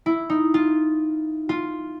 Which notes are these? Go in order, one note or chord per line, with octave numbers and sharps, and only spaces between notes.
E4
D#4
F4
F4